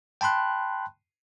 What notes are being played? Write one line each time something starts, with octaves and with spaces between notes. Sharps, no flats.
G5 A5 B5 C6 F#6